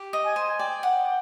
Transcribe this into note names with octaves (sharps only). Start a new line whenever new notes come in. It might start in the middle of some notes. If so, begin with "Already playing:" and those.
Already playing: G4
D#5
G#5
C5
D5 G5
F#5